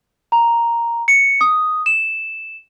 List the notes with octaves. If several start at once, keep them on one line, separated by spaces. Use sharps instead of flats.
A#5
C#7
D#6
E7